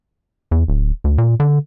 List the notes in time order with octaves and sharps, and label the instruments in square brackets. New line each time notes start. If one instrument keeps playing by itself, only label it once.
[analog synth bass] E2
D1
D2
A#2
D3